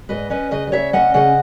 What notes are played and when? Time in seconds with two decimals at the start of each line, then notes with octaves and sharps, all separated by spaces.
0.09 G#2 B4 D#5
0.30 C#4 B4 D#5
0.51 C#3 B4 D#5
0.67 D#5
0.72 C#3 C#5 E5
0.93 C#4 D#5 F#5
1.14 C#3 D#5 F#5